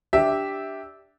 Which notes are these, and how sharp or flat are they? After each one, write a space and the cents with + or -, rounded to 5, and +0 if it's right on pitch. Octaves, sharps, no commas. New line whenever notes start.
D4 -5 G4 +0 E5 -10